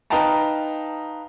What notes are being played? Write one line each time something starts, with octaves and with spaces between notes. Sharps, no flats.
D#4 B4 F5 G5 A5 A#5